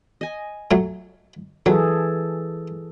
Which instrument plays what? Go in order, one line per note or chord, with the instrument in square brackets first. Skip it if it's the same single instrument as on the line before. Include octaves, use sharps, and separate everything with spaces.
[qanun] D#5 G#5
[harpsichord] F#3 A3
[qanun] E3 [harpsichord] F#3 [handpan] G#4 A4